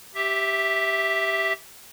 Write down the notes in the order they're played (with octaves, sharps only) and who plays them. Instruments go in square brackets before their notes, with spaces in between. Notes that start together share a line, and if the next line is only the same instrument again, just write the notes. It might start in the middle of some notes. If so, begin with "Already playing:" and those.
[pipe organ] G4 E5